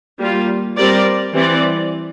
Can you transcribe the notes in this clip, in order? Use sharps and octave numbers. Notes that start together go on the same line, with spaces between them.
G3 A#3 F4
G3 C4 G4 A#4 D5
E3 G3 C4 G4 D5